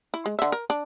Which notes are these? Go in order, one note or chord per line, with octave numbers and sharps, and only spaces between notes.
E4
G#3
D3 E5
A#4
D4